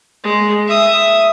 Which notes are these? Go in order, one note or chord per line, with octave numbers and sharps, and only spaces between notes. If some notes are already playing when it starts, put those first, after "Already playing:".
G#3
E5 D#6